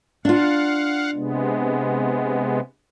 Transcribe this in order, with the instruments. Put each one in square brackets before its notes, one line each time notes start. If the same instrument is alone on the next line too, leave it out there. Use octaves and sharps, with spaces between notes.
[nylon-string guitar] D4 F4 [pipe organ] F5 F#5
[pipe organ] C3 G#3 B3